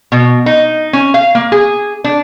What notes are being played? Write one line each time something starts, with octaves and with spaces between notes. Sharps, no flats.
B2
D#4
C#4
F5
A#3
G#4
D4